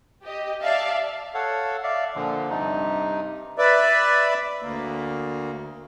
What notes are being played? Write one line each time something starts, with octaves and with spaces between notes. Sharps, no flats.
G4 D#5
D5 E5 F5 A5
A4 C#5 F5 F#5
D5 E5 F5
A#2 D3 F3
G2 C3 D#4
B4 D5 E5
D2 A#3